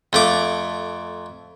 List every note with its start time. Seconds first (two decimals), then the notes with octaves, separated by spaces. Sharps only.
0.13 F2 A3 D6